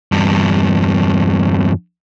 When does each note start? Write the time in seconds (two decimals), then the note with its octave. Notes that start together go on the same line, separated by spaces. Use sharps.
0.12 E2 G2